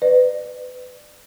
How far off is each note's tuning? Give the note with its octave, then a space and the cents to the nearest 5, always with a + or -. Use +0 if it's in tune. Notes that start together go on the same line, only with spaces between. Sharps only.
B4 +30 D5 +25